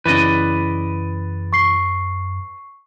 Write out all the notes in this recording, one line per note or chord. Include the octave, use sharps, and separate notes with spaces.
F#2 C#3 E3 B4 D5 D#5
C#6 C7